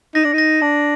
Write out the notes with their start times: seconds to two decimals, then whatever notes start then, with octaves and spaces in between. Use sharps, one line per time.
0.15 D#4 A#6
0.24 D4
0.33 D#4 A#6
0.62 D4 A5